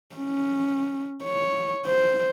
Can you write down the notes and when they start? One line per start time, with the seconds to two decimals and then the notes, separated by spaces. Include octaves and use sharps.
0.15 C#4
1.23 C#5
1.86 C5